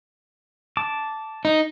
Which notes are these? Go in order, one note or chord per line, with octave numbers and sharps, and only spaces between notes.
A5 D6
D#4